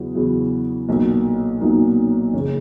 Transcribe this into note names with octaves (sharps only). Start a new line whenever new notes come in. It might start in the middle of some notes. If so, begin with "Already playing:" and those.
Already playing: E2 C#3 F#3 E4 F#4 G#4
E2 C#3 F#3 E4
B1 A#2 F#3
B1 A#2 F#3 D#4
F#1 C#3 C#4